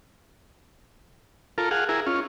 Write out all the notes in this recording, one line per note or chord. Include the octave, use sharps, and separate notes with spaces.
F4 A4 A#4
G#4 F5 F#5
E4 G#4 A#4
C#4 F4